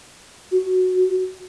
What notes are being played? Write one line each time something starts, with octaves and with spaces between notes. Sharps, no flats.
F#4